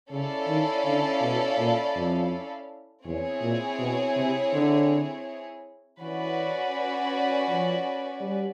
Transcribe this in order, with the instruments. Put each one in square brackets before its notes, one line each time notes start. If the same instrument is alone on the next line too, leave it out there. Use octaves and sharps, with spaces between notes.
[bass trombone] C#3 [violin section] C#4 E4 A4 D5 F5
[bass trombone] D#3
D3
B2
A#2
F2
[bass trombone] E2 [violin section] C4 E4 G#4 C#5
[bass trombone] A#2
B2
C3
D3
[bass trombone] E3 [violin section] C#4 F#4 B4 D5
[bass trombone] F3
G3